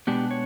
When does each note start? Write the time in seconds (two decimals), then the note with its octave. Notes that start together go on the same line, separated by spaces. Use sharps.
0.07 B2 G#3 B3 D4 G4
0.31 C#5